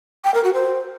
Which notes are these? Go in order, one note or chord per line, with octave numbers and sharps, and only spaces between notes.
G5
A#4
F#4
C5